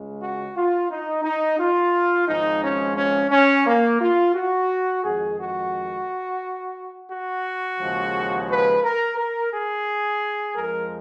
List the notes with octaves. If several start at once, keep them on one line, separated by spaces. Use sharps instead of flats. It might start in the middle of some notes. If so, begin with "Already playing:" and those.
Already playing: C#2 C#3 G#3
F#4
F4
D#4
D#4
F4
G#1 G#2 F3 G#3 D#4
C#4
C#4
C#4
A#3
F4
F#4
F2 D#3 G#3 G#4
F#4
F#4
D#2 C#3 F3 G#3
B4
A#4
A#4
G#4
F2 F3 G#3 A#4